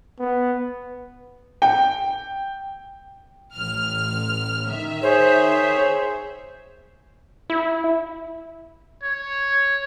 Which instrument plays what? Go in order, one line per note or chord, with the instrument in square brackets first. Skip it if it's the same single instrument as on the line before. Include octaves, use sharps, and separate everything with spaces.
[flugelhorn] B3
[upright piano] G5
[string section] A1 F6
D#3 E5
[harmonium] G#4 C#5 [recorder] C5
[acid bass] E4
[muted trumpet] C#5